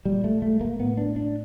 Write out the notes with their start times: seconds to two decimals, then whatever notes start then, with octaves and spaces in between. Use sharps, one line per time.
0.05 A#2 G3
0.24 A3
0.42 A3
0.61 A#3
0.79 A2 B3
0.97 D4
1.16 D4